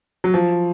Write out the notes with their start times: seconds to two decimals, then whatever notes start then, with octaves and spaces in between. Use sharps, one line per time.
0.24 F#3
0.34 F3